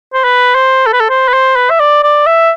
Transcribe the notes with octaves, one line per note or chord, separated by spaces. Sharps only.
C5
B4
C5
A4
B4
A4
C5
B4
C5
B4
E5
D5
D5
E5